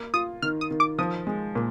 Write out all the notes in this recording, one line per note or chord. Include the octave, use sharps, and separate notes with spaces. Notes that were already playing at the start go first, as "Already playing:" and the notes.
Already playing: A#3
F4 D#6
D#3 F6
D#6
D#3
D6
F3 D#6
G#3
A#2